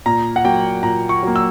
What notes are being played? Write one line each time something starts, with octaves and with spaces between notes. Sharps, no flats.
A#2 A#5
F#5
F#3 A#3 G5
A#2 A#5
C#6
F#3 A#3
E6